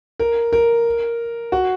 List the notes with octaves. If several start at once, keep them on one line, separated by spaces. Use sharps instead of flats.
A#4
A#4
F#4